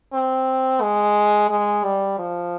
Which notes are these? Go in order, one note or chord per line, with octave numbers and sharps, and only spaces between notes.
C4
G#3
G#3
G3
F3